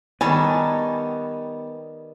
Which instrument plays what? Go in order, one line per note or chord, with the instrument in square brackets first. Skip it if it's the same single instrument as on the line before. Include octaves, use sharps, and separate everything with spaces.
[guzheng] D#3 C#5 A5 [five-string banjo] G3 G#5 [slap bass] B3